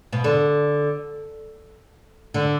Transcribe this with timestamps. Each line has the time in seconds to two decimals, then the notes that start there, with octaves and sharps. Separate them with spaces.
0.13 B2
0.24 D3
2.34 D3